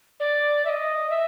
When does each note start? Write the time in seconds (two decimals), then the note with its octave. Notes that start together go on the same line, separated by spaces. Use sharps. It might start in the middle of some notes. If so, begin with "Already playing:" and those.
0.20 D5
0.65 E5
0.69 D#5
1.10 E5